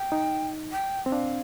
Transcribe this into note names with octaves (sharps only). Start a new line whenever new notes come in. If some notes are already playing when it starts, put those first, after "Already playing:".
Already playing: G5
D#4
G5
C4
D4 F5